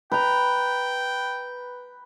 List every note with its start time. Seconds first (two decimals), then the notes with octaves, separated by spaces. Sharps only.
0.12 B4 G5 A#5